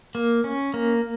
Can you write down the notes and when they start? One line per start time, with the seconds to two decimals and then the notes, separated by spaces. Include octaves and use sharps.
0.15 A#3
0.44 C#4
0.74 A#3